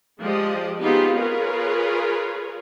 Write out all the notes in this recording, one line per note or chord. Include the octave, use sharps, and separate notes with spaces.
F3 G#3 G4 D5 D#5
B3 C4 D#4 F4 G4 G#4
F4 G#4 A#4 B4 C#5